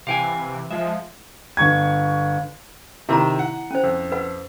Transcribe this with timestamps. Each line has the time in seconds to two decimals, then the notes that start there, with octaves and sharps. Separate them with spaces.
0.07 C3 E3 F5 G5 G#5
0.71 F3 G#3 E5
1.57 G1 C#6 G#6
3.09 C3 D#3 E4 A#5
3.39 F#5
3.71 C#4 C5
3.83 F2
4.12 B4 F#5